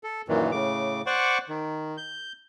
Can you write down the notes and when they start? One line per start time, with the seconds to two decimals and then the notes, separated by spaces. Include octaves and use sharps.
0.04 A4
0.28 F#2 A#2 D#3 E3
0.52 A2 C#3 D6
1.06 C5 D5 F#5 C#6 D6
1.49 D#3
1.98 G6